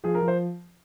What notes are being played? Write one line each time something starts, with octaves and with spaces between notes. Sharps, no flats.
F3 G#4
A#4
F3
C5